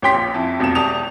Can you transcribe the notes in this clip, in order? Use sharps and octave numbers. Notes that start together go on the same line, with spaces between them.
A1 C#4 G4 G5 C6 B6
A#1
F2 E4
F1 B1 F2 E4 E7
E1 G4 D5 A5 D#6 F7